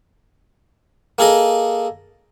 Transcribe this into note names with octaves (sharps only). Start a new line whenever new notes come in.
A#3 G#4 A4 D#5